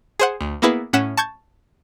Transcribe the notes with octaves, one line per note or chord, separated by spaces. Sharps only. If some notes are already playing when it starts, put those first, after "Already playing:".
G#4 C5 F#5
D2
A#3 B3 E4 G#4 B4
A2 C#4 F#5 B6 E7
A5 C#6 G6 G#6